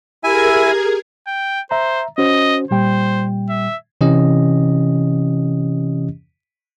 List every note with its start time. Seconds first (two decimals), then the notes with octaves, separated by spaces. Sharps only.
0.24 E4 G4 G#4 A#4 E5 G#5 G#6
1.27 G5
1.71 C5 E5 A#5
2.18 C#4 F#4 C5 D#5
2.71 A#2 G3 C5 G5
3.49 E5
4.01 C3 E3 C#4 G4 D#5